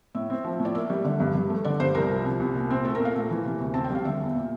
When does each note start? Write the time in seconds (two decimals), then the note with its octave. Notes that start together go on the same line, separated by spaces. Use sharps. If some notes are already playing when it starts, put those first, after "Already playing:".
0.15 A2 E5
0.30 C4
0.44 F3
0.60 A2
0.65 D5
0.75 A#3 E5
0.90 G3
1.04 D3
1.20 G2
1.35 G2
1.50 A3
1.64 D3 D5
1.80 G2 C5
1.95 C2 A#4
2.10 F3
2.25 C3
2.40 C2
2.55 A#2
2.70 C4
2.85 A3 A4
2.95 A#4
3.00 A#2
3.05 F5
3.15 A3
3.30 E3
3.45 C3
3.61 D2
3.74 C4 A5
3.84 G5
3.90 G3 F5
4.05 D3 E5
4.20 E2
4.35 A#2